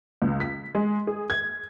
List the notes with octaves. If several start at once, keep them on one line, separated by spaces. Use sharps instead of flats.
C#2
B6
G#3
G#4
G#6